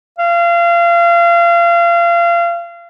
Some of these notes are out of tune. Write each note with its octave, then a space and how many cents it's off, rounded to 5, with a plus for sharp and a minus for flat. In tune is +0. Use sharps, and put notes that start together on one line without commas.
F5 -30